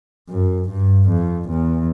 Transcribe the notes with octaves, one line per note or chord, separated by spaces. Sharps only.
F#2
G2
F2
E2